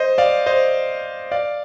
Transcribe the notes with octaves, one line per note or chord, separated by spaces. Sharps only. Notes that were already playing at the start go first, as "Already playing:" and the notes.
Already playing: C5 D#5
D5 F5
C5 D#5
D5 F5